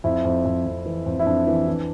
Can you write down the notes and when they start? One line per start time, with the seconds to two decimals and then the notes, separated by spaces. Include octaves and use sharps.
0.04 F2 E4
0.25 F2
0.45 F2
0.66 F2
0.86 E3
1.06 F2
1.19 E4
1.26 F2 D4
1.47 E3
1.68 E3